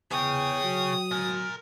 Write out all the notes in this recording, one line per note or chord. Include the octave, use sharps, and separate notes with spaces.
E2 G#4 C#5 G5 D#6
F#3
A#4 G#5